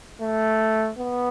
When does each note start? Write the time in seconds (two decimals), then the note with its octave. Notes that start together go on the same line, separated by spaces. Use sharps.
0.21 A3
0.98 B3